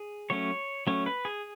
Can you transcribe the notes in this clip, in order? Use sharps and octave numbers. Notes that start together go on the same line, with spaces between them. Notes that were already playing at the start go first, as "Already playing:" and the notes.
Already playing: G#4
F#3 A3 C#4 C#5
F#3 A3 C#4 C#5
B4
G#4